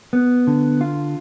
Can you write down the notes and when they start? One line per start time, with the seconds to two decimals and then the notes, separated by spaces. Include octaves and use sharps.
0.13 B3
0.47 D3
0.81 F4